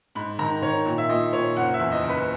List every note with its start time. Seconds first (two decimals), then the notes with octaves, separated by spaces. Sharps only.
0.15 G#2 B5
0.39 D#3 A#5
0.62 D#3 C#5
0.86 A#2
0.98 E5
1.09 A#2 D#5
1.33 A#2 C#5
1.57 F#1 F#5
1.74 E5
1.80 E2
1.92 D#5
2.04 F#1
2.09 B4